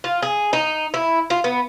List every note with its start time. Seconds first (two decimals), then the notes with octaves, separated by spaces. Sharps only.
0.04 F4
0.22 G#4
0.53 D#4
0.94 E4
1.30 F4
1.44 B3